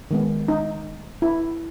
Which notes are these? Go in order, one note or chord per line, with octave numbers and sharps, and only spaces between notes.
D#3 G#3 B3
D#4
E4